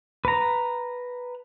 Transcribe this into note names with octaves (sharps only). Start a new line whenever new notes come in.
B4 A#5